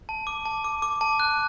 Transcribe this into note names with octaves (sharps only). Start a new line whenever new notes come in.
A5
D6
A5
D6
D6
A5
F#6